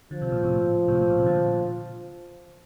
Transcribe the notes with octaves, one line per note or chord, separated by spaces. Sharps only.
D3 F3
C3
A#2
A2 C3
A2 C3
A2
A#2
C3
A#2 D3